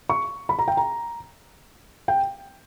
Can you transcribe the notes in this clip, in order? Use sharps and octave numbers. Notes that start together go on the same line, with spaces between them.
C#6
B5
A#5
G5
A#5
G5